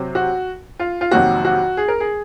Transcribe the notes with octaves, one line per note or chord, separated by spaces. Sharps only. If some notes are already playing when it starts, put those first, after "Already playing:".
Already playing: C3 F#3 C4
F#4
F4
F4
F2 C3 D#3 F#3 A#3 F#4
F#4
G#4
A#4
G#4